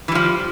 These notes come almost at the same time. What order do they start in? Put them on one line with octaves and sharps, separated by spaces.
E3 G3 F3